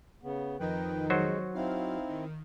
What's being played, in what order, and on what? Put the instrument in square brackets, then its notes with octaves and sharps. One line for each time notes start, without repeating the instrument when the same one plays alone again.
[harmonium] C#3 B3
[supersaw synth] F2 D#3 D#4 [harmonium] B4 G5
[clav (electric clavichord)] F#3 F#4 C5 [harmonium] G#3
[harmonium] C4 D#4 E4 [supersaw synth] F5
[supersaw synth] D#3